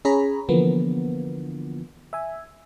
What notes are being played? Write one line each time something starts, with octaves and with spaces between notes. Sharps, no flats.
C#4 G#4 C#5 A#5 B5
D3 E3 F3 A#3 B3
E5 G#5